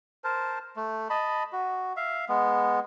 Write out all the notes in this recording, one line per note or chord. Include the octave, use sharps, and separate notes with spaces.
A#4 C5 A5
A3
D#5 A5 B5
F#4
E5 F5
G#3 B3